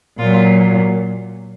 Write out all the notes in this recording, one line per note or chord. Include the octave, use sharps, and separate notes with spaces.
A#2 F#3 F4